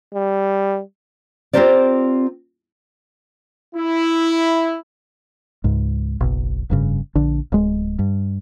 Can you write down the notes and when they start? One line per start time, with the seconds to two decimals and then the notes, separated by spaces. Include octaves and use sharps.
0.14 G3
1.53 C4 F4 G4 A#4 C5 D5
3.75 E4
5.64 C#2 G#2
6.21 F#1 B1
6.70 F1 G2 C#3
7.15 A#1 D3 D4
7.52 D1 G#3
7.99 G2